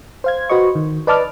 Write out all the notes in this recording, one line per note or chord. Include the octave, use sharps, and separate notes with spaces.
C5 F5 G#6
F#4 B4 C5 D#5 C#6
D#3
B4 D5 D#5 A5 D6 F6